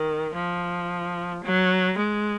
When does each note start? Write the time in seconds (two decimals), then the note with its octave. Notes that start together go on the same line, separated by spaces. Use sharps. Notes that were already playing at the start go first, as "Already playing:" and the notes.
Already playing: D#3
0.35 F3
1.44 F#3
1.98 G#3